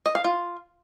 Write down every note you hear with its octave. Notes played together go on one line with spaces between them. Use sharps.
D#5
F5
F4